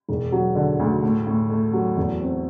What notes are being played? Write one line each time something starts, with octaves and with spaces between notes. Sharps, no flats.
E1
F#3
D3
D2
A2
A2
A3
F#3
E2
C4